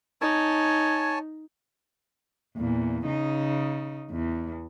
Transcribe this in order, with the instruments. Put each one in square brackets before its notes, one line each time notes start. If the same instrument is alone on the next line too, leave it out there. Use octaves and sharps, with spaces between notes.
[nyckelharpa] D#4 [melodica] C#5 G#5 A5
[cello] E2 A#2
C#3 D#4
E2